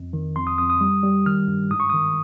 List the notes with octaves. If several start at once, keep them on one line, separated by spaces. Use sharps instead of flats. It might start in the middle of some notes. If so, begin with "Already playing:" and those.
Already playing: F2
D#3
F2 C6
D#6
F2 D#6
D#6
G3
G3
D#3 F6
G2
G#2 D#6
C#6
D#3 D#6